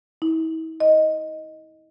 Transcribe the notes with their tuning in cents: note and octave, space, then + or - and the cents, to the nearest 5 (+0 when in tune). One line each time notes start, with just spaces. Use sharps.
E4 -45
D#5 +5